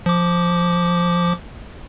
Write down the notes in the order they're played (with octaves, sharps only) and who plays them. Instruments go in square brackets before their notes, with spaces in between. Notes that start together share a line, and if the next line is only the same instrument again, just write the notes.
[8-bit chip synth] F3 D6